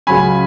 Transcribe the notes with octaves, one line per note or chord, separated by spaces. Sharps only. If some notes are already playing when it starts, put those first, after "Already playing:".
C#2 C#3 F#3 C#4 G#5 B5